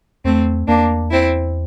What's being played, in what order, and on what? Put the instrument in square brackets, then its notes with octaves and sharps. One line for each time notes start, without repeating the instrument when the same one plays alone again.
[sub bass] E2 [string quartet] A3 C4
[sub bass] E2 [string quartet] A#3 D4
[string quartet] C4 E4